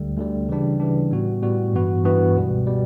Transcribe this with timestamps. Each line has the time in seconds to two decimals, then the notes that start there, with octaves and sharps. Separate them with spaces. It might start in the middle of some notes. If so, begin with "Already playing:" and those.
Already playing: D2 D3 G3
0.17 D2 D3 G3
0.49 C#3 E3 G3 D4
0.80 C#3 E3 G3 D4
1.11 A2 G3 B3 F#4
1.42 A2 G3 B3 F#4
1.73 G2 E3 B3 F#4
2.04 G2 E3 B3 F#4
2.35 C#2 B2 G3
2.67 B2 G3